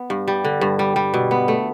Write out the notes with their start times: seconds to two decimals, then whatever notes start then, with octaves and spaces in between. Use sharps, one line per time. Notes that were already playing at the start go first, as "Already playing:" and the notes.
Already playing: B3
0.10 G2
0.28 G3
0.44 D3
0.61 G2
0.79 G3
0.96 G3
1.14 B2
1.31 B3
1.48 A3